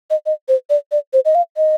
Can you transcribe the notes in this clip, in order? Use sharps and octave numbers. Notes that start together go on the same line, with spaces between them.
D#5
D#5
C5
D5
D5
C5
D#5
F5
D#5